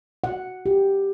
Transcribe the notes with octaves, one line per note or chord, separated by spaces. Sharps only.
F#5
G4